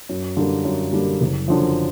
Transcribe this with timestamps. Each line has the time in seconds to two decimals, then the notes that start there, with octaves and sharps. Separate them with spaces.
0.09 F#2
0.36 D3 G3 A#3
0.65 F#2
0.93 D3 G3 A#3
1.21 F#1
1.48 F#2 D3 F3